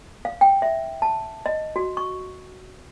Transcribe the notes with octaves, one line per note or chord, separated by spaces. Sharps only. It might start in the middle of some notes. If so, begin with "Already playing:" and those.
F5
G5
E5
A5
D#5
F#4
C#6